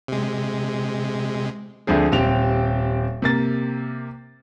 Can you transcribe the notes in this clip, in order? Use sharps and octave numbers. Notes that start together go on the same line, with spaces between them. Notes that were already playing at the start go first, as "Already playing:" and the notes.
C3 G#3
D2 D3 F3 C4 G#4
D#1 C4 G4 G5 F7
C3 A#3 A6